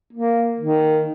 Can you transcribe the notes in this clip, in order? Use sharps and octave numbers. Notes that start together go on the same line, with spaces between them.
A#3
D#3